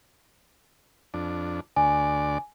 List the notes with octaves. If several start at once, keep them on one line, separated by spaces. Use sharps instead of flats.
F2 D4
D2 D5 G#5